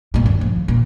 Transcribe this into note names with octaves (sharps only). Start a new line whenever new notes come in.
G1 A#2
D#2
F3
A#2